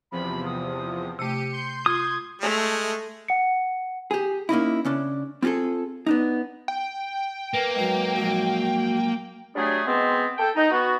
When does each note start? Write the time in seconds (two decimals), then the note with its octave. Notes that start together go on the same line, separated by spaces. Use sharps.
0.12 E2 C3 F3 B5
0.46 D#6
1.19 C3 A3 G4 C#7 D#7
1.52 C6 G6
1.86 F4 D#6 G#6
2.41 G#3 A3
3.28 F#5 C#7
4.11 G4 G#4
4.49 A#3 C#4 D#4 E4
4.85 C#3 C#4 D4
5.43 C4 F4 F#4 G#4 A4
6.06 B3 D4 D#4
6.68 G5
7.54 A#3 B4
7.75 G#2 F#3
8.16 A#1 G#2 F#3 F#4
9.56 F#3 G3 A3 D4 G#4
9.87 B2 G#3 B3 C4
10.38 A4 G5
10.56 D#4
10.71 B3 F#4